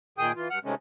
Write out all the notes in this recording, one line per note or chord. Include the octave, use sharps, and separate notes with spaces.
A#2 D#3 G#4 G5 D#6 G6
E3 F4
G2 F#5 F6
C3 D#3 G#3 A3 C#4